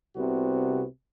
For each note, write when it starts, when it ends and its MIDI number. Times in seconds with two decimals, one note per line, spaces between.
0.16 0.84 36
0.16 0.84 48
0.16 0.84 59
0.16 0.84 66